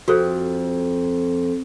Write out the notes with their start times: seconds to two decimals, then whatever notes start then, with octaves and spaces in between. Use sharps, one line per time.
0.08 F2 F#4 A4 C5